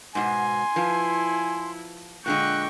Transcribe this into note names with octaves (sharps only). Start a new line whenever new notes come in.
G#2 B2 G#5 C6
F3 E4 B4
A#2 D3 G#3 G5 C#6 F#6